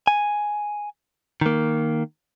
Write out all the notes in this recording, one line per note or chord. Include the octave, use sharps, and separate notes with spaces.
G#5
D#3 A#3